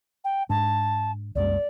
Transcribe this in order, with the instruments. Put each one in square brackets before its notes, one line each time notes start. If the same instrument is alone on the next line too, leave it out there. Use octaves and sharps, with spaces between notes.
[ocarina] G5
[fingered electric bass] G#2 D4 [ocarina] A5
[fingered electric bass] C2 F#2 G#3 [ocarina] D5